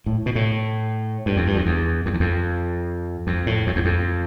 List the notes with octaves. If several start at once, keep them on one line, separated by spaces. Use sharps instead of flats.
A2
B2
A2
G2
F2
G2
F2
E2
F2
E2
F2
F2
A2
F2
E2
F2